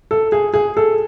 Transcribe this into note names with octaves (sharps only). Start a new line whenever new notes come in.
A4
G#4
G#4
A4